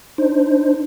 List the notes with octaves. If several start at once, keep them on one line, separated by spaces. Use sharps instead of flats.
D4 D#4 C5